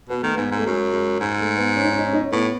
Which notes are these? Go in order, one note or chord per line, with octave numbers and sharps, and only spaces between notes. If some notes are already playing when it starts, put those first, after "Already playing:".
B2 B3
D#3 A3
G#2 B3
G#2
A3
F#2 G#3
G#3
G#2 G#3
A3
B3
C#4
D#4
C#4
D#4
C#4
D#4
C#4
A2 B3